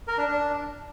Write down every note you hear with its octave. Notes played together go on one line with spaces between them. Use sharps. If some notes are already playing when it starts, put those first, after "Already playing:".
A#4
D4
D4